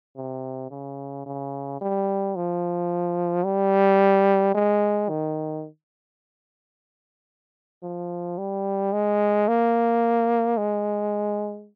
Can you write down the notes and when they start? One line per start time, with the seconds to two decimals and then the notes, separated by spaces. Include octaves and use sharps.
0.17 C3
0.71 C#3
1.26 C#3
1.81 G3
2.36 F3
3.45 G3
4.55 G#3
5.09 D#3
7.83 F3
8.38 G3
8.93 G#3
9.48 A#3
10.57 G#3